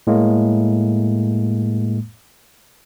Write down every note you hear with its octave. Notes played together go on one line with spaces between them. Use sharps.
A2 G#3 A#3